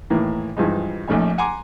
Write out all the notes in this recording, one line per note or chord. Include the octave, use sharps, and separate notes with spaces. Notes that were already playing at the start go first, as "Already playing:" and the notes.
A2 D#3 E3 A#3
G2 E3 F3 G#3 D#4
A#1 A#2 A3 C#4 D#4 G#5
F#5 G#5 A#5 C6 D6